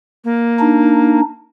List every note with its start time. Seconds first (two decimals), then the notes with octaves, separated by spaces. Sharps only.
0.24 A#3
0.60 D4 D#4